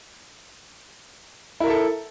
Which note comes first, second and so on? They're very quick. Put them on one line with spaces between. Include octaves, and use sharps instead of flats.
E4 A#4 E5 A4